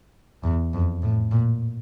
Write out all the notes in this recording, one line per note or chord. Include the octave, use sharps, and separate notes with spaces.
E2
F2
A2
A#2